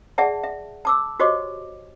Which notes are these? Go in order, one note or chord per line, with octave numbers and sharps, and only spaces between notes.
G#4 D5 E5 F#5 A5
E5
A5 D6 E6
F#4 G4 C5 C#5 D#5 D6